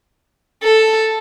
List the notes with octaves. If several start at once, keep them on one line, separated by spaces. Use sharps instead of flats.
A4